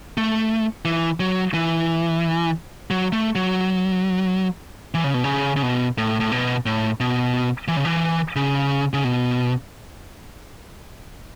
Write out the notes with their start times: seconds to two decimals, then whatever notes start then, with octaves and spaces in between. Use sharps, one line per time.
0.17 A3
0.85 E3
1.20 F#3
1.54 E3
2.90 F#3
3.13 A3
3.35 F#3
4.94 E3
5.04 C#3
5.14 B2
5.24 C#3
5.56 C#3
5.63 B2
5.98 A2
6.20 A2
6.32 B2
6.66 A2
7.00 B2
7.68 E3
7.77 C#3
7.85 E3
8.36 C#3
8.94 C#3
9.04 B2